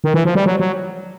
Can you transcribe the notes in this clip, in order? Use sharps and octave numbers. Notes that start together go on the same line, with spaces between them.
D#3
E3
F3
G3
F#3
F#3